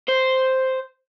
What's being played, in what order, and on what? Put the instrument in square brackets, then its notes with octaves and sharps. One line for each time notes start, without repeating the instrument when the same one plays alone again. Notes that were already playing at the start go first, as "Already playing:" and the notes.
[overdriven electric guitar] C5